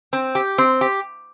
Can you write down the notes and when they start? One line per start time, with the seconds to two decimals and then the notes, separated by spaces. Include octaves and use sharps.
0.13 C4
0.35 G4
0.58 C4
0.81 G4